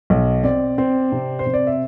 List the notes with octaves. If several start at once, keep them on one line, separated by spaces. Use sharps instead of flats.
B1
C4 D5
C4
C3
C5
C3
D5
E5